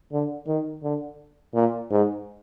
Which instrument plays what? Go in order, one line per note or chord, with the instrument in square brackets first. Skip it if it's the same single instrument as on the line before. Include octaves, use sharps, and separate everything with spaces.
[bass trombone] D3
D#3
D3
A#2
G#2